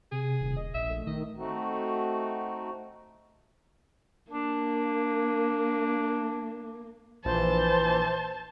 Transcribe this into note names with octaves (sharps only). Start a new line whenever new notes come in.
C3 G#4
D#1
D#5
A#1 D#5 E5
A3
D#3 D#5
A3 C4 D#4 F#4
A#3 D4
A#1 E3 C5 A5